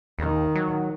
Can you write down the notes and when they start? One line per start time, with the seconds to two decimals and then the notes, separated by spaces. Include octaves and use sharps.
0.19 D#2 D#3
0.55 F#3